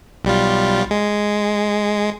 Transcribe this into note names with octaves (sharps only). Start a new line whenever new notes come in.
B1 G3 F4
G#3